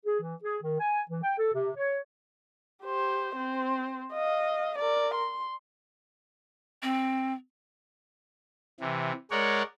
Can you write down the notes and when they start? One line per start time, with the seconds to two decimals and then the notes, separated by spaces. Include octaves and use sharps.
0.06 G#4
0.20 E3
0.43 G#4
0.62 D#3
0.79 G#5
1.09 E3
1.23 G5
1.38 A4
1.53 C3
1.76 C#5
2.84 G4 C5
3.36 C4 C5
4.13 D#5 F5
4.79 A#4 D5
5.14 C6
6.83 C4
8.80 C3 E3
9.31 G#3 A#4 C#5 D5 F#5